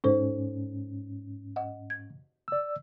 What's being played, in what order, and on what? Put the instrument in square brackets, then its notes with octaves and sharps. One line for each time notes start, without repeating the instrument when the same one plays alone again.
[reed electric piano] G#2 C#4 [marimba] D#4 A4 C5
[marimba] D#5 F#5
G#6
[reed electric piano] D5 E6